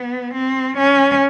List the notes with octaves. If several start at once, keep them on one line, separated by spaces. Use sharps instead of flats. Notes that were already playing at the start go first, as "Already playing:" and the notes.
Already playing: B3
C4
C#4